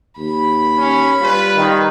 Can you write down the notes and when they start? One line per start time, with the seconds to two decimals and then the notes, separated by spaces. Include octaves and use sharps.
0.18 D#2 B5
0.79 C#4
1.22 G3 F4 B4
1.55 D#3